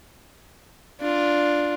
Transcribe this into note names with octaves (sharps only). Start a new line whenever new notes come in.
D4 F4